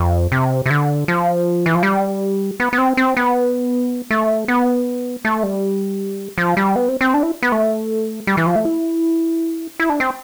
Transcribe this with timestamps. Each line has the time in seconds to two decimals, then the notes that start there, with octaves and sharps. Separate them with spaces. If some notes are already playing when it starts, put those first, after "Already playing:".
Already playing: F2
0.32 C3
0.66 C3
0.70 D3
1.08 F3
1.66 E3
1.75 F3
1.83 G3
2.60 B3
2.73 B3
2.78 C4
2.97 C4
3.17 B3
4.10 A3
4.48 B3
5.25 A3
5.43 G3
6.38 F3
6.57 G3
6.76 B3
6.88 C4
7.01 C4
7.14 D4
7.23 E4
7.43 B3
7.52 A3
8.27 G3
8.37 E3
8.46 F3
8.55 A3
8.65 E4
9.80 E4
9.89 D4
10.00 C4